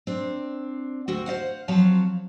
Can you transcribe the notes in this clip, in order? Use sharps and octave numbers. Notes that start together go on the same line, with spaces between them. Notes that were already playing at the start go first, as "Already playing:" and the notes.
C4 D4
D2 C4 F#4
C5 D#5 F5 F#5
F3 F#3 C4 C#5 F5 A5